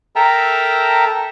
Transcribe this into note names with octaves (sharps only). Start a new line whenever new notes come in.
A4 A#4 E5 G5 A5 A#5